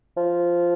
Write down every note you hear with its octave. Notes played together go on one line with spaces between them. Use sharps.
F3